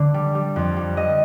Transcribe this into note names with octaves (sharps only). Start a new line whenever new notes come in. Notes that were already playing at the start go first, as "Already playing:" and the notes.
Already playing: D3 D5
G3
G3
F2
G3
G3 D#5